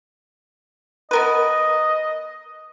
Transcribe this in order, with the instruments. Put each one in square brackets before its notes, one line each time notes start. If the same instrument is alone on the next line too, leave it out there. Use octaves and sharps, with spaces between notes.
[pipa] B3 A#4 B4 [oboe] D#5